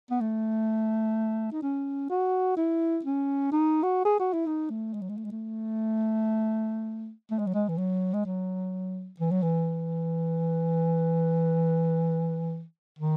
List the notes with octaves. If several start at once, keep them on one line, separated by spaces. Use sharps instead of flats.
B3
A3
D#4
C#4
F#4
E4
C#4
D#4
F#4
G#4
F#4
E4
D#4
A3
G#3
F#3
G#3
A3
G#3
A3
A3
G#3
F#3
G#3
E3
F#3
G#3
F#3
E3
F#3
E3
D#3